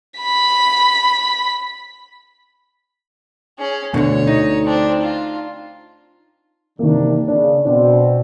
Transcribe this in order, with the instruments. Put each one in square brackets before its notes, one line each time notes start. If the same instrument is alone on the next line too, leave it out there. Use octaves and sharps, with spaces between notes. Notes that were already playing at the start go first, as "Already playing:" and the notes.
[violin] B5 B6
[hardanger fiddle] C#4 G#4
[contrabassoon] D2 [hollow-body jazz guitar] B2 D3 [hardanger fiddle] C#5
[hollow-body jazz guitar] D#4
[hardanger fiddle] C4 D4
F4
[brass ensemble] C3 E3 D4 [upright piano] D#3 A#3
[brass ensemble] C#3 [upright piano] D4
[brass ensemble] B2 C4 [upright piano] D4